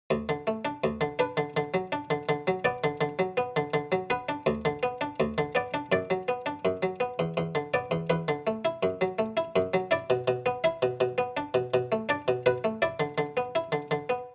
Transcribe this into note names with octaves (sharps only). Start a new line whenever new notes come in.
D2
D3
A3
D4
D2
D3
D4 B4
D3
D3
F#3
D4
D3
D3
F#3
B3 D5
D3
D3
F#3
B3
D3
D3
F#3
B3 B4
D4
D2
D3
B3
D4
D2
D3
B3 D5
D4
F#2 D5
F#3
B3
D4
F#2
F#3
B3
E2
E2
D3
B3 D5
E2
E2 B4
D3
A3
E4
F#2
F#3
A3
E4
F#2
F#3
E4 D5
B2
B2
B3
E4 E5
B2
B2
B3
D4
B2
B2
A3
D4 D5
B2
B2 B4
A3
E4 D5
D3
D3
B3
E4
D3
D3
B3